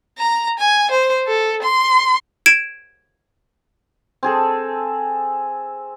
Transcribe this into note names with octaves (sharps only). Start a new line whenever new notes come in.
A#5
G#5
C5
A4
C6
G#6 D7 E7
C4 G#4 A4